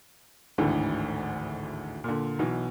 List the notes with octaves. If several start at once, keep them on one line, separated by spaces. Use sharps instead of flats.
G#1 D2 A2 D3 E3 G#3
A#2 D3
B1 B2 E3